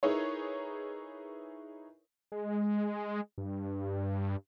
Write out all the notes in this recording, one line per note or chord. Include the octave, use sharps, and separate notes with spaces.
D#4 E4 G#4 A#4 B4 C#5
G#3
G2